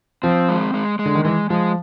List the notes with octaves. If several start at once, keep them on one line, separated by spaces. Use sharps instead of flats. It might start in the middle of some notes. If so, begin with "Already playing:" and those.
F3 C4
G#3
G#3
G#3
D3
D#3
E3 G#3
F3 G#3